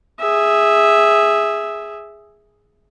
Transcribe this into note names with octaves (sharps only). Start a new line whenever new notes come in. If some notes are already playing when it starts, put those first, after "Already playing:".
G#4 E5